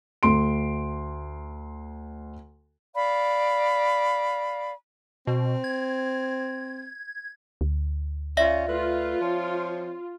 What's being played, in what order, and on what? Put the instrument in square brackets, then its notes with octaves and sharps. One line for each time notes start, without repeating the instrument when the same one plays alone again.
[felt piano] D2 C6 D7
[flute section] D5 F5 B5
[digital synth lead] B2 [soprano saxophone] C4
[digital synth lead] G#6
[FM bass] D2
[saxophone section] C#4 F4 [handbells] D5 E5 A#6
[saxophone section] A3 B4 [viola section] F4
[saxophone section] F3 C4 C#5